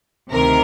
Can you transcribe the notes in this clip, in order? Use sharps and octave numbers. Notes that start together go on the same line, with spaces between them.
D2 C3 D#3 A#4